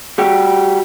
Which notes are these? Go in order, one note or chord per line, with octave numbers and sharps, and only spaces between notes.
G3 F#4 G4